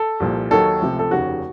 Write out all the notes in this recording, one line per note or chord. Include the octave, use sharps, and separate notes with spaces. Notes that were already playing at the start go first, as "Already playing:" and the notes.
Already playing: A4
C2 A#2 F3
D#2 D#3 F#3 A4
C#2 C3 F3 A3
A4
F1 D#2 C#3 F#4